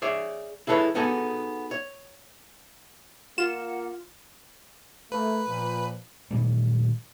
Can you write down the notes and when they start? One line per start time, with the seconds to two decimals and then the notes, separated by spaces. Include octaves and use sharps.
0.02 G#4 C#5 D5 E5
0.67 E4 G#4 A4 B4 C#5
0.95 B3 D#4 F#4 G#4 A4 G#5
1.71 C#5
3.38 A#3 F4 F#5 E7
5.12 A3 A#3 B4
5.47 A#2 F3
6.31 A#2 D#3 F#3 G#3